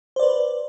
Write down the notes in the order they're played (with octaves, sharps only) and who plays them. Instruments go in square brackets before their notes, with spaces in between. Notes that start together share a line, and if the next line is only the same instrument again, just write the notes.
[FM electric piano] C5
D5
B4